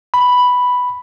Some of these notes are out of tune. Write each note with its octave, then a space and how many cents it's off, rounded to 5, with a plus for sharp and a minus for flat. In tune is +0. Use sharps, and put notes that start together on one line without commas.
B5 +0